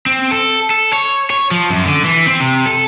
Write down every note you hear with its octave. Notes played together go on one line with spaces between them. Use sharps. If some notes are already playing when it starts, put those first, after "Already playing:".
C4
A4
A4
C#5
C#5
F3
F#2
D3
E3
C4
C3
A4